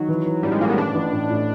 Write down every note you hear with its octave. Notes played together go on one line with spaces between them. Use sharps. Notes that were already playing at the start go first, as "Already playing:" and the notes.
Already playing: D#3 F#3
E3
E3
A1 G3
G#3
A2 A#3
B3
A1 D4
A1
A1
A2